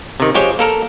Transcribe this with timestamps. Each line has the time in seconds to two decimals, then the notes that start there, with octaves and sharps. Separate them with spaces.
0.20 C3 D#3
0.34 F3 G#3 G4 C5 C#5 G5
0.59 A#3 A4 A#4